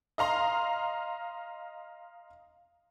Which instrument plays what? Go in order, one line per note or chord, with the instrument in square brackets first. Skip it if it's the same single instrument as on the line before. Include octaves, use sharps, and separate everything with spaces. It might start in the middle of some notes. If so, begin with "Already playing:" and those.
[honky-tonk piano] D#5 F5 A#5 C6